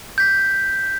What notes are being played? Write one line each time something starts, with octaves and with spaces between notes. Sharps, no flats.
G6 B6